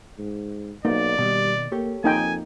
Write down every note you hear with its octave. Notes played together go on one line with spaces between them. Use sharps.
G#2
B1 A#3 D#4 D5
B2 D#3 G3
A#3 G4 A4 C#5
F2 A#3 D#4 G5 G#5